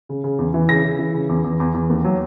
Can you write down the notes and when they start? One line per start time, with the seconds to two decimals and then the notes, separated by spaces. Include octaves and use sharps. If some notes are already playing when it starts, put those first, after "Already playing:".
0.09 C#3
0.24 C#3
0.39 E2
0.54 E3
0.69 C#3 A#6
0.84 C#3
0.99 E3
1.14 C#3
1.29 E2
1.44 E2
1.60 E2
1.74 E2
1.90 D#2
2.04 F#3